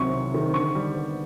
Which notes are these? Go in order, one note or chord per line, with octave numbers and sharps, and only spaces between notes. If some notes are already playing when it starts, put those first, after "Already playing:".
Already playing: C2 C3 D#3 F#3 C#6
C3
D#3
D3 C#6
G3
B3